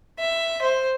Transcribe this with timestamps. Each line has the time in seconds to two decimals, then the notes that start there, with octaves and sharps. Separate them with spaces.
0.19 E5
0.62 C5